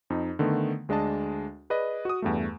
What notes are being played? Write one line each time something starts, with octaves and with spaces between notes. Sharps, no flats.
F2 D#4
D3 D#3 A3 B3
D2 G#3 D4 D#5 A5
G#4 B4 D5 D#5
F#4 D#6
E2 G2 A3